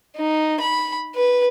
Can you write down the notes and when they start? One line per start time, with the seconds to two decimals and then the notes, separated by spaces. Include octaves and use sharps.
0.16 D#4
0.60 B5
1.15 B4